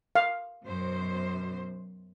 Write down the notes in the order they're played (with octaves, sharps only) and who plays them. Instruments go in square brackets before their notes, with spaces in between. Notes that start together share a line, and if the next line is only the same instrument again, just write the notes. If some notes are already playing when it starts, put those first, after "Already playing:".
[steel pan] F5
[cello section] F#2 B2 C5